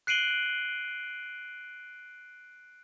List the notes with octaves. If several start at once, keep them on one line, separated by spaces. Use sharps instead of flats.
F#6 C7 D7 D#7 F#7 G7